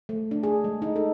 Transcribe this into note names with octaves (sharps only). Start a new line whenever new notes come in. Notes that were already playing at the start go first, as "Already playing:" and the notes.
A3
D4
G#4
G#3
D#4
A4